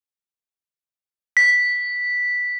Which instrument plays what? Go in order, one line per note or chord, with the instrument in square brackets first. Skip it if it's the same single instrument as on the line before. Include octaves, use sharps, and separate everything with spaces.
[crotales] B6